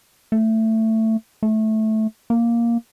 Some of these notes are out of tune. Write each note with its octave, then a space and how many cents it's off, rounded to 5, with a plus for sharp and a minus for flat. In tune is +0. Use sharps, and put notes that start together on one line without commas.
A3 +15
A3 -10
A#3 +5